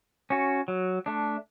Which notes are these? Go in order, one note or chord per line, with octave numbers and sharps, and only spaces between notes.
C#4 F#4
F#3
A3 D4